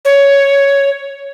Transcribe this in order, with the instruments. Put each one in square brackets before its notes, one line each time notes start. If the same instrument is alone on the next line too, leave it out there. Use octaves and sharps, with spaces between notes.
[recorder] C#5